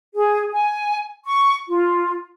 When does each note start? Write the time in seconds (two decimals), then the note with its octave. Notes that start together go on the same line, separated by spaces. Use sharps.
0.14 G#4
0.52 G#5
1.25 C#6
1.68 F4